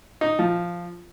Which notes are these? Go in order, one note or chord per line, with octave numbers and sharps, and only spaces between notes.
D#4
F3